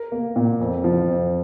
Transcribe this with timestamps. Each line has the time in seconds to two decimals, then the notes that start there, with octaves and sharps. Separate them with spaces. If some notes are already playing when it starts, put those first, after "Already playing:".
Already playing: A#4
0.12 A#3
0.36 A#2
0.60 F2
0.84 F3
1.08 F2